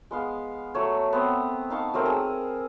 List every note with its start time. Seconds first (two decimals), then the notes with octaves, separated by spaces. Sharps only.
0.11 G#3 B3 F5
0.74 F#3 A3 C#5
1.13 B3 C4
1.70 D#4 F5 A5 C#6
1.94 F#3 A3 C4 A#4
2.06 G#4 E6